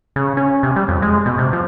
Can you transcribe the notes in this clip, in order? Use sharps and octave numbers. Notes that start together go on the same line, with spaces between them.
C#3
C#4
C3
G3
F2
G#3
B2
C3
F3